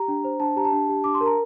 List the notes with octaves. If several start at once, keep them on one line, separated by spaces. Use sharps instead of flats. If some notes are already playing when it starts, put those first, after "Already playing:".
Already playing: G4 A#5
D4
C5
D4 A5
G4 A#5
A5
D4
G4
D4 D6
C6
A#4
A#5